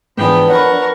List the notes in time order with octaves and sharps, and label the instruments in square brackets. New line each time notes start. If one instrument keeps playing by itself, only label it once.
[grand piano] G#2 E3 [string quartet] F3 D4 B4 [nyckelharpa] B3 G5
[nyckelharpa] A#4 C#6 [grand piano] C#5 B5 [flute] F#5